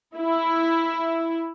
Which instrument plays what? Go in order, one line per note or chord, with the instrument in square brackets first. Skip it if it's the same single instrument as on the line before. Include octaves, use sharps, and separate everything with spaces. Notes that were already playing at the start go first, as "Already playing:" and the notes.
[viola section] E4